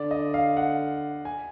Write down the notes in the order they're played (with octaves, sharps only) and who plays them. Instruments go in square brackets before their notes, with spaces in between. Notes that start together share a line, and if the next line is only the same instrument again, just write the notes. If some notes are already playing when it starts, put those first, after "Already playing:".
Already playing: [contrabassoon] D3 [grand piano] D5
[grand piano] D#5
F5
F#5
G#5